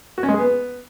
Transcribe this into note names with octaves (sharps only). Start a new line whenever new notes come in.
F#4
C#4
G#3
G#4
B3